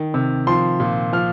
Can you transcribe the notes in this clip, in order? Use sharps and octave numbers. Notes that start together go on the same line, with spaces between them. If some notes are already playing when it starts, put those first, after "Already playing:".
Already playing: D#3
C3
F3 C6
A#2
F3 F6